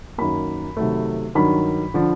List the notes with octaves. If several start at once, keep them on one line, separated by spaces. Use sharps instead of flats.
F#2 D#3 F#3 A#3 B5
C3 D#3 F#3 A3
G2 D#3 F#3 B5
D3 F3